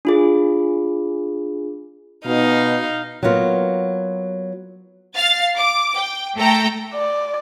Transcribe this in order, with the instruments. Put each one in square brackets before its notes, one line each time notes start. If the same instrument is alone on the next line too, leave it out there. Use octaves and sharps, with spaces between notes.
[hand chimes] D4 F4 G#4
[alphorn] B2 [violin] D#4 F5
[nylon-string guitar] F#3 A#3 B3 F4
[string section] F5 A6
D6
G5
A3 A4 G5 A#5
[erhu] D5